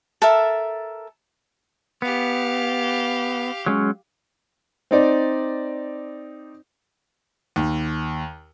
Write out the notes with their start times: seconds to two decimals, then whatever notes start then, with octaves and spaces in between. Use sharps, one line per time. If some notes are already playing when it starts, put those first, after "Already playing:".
0.22 A4 A#4 E5
2.02 B3 G4 F5
3.66 F#3 G#3 C#4
4.91 C4 D#4 D5
7.56 D#2